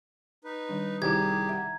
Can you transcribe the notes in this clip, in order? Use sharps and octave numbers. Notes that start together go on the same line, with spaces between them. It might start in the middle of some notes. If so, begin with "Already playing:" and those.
D#4 B4
D#3 G3 D4
C2 D#3 D#4 E4 G4 G#4 A#5 G#6
E5 F#5